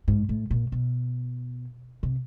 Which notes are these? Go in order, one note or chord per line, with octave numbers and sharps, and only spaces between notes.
G#2
A2
A#2
B2
C3